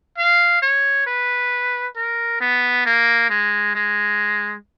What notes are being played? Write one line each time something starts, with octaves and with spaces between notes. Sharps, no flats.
F5
C#5
B4
A#4
B3
A#3
G#3
G#3